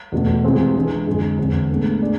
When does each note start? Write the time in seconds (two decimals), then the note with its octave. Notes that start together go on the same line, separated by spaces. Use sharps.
0.12 E2 B2 A3
0.44 C3 E3 G#3 C4 F4
0.76 E3 G#3 D4 G#4 B4
1.07 F2 D3 G#3
1.38 E2 D3 G#3 C4 G#4
1.70 A2 G#3 B3 D4 A4
2.01 A3 D4 G#4 D5